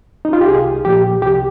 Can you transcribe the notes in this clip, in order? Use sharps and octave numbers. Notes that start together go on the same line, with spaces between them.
D#4
F4
G4
C2 G#4
A#2 F3 G4
C2 G4